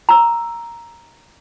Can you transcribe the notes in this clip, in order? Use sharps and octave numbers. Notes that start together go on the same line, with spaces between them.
A#5 E6